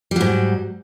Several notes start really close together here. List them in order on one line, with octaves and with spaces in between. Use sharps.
G3 F#3 G#2